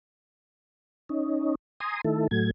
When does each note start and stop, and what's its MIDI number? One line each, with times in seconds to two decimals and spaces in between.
1.09 1.55 61
1.09 1.55 63
1.80 2.01 80
1.80 2.01 82
1.80 2.01 84
1.80 2.01 87
2.04 2.27 51
2.04 2.27 57
2.04 2.27 64
2.04 2.27 69
2.31 2.51 45
2.31 2.51 54
2.31 2.51 57
2.31 2.51 92